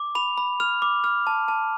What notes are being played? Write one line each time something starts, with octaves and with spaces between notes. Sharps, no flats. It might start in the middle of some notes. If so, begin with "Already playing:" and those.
Already playing: D6
B5 F7
B5
F6 F7
D6
F6
A5
A5